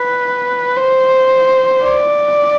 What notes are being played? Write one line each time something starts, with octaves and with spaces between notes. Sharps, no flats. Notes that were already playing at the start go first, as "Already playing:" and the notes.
Already playing: B4
C5
D5